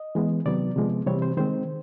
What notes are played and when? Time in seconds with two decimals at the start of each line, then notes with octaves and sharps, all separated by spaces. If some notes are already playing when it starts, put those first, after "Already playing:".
Already playing: D#5
0.15 E3 G#3 B3
0.45 C3 D#3 F#3 B3 D5
0.76 C3 F3 G#3 B3
1.06 C3 E3 G3 C4 C#5
1.22 C5
1.37 D#3 G#3 C4 C5